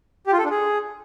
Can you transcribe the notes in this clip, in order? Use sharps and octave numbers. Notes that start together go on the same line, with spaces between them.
G4
F4
A4
D4
G#4